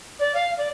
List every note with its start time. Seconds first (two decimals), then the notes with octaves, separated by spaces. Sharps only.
0.19 D5
0.34 F5
0.57 D5